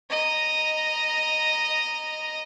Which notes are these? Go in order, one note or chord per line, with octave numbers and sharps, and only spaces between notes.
D#5 A#5